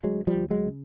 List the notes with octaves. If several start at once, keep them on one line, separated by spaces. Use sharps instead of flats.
D2 F#3 G#3
F3 G3
D2
F#3 G#3
C#3